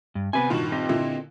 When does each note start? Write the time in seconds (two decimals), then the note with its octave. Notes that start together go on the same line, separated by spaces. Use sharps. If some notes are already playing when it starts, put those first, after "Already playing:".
0.15 G2
0.33 C3 B3 B4 G#5
0.50 G2 A#2 D#3 F4 F#4
0.72 C4 G4 D#5
0.89 A#2 D3 E4